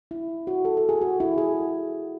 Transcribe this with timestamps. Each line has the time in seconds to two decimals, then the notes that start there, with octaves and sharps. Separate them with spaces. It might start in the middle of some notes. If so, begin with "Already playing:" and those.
0.11 E4
0.47 F#4
0.65 A4
0.77 A4
0.89 G#4
1.01 F#4
1.20 E4
1.38 G#4